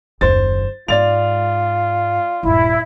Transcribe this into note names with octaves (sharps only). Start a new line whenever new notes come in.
F#1 D#2 C5 A6
G#2 F4 D5 A6 F7
D#1 G2 E4